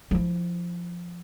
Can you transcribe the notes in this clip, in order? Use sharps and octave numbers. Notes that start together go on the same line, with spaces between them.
F3 E4